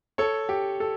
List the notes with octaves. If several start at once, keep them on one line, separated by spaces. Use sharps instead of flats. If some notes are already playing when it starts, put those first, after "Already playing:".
A4 C#5
G4
A4